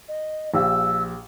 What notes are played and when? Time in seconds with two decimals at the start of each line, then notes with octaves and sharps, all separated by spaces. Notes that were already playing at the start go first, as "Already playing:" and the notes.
0.09 D#5
0.54 A#1 G4 F5 E6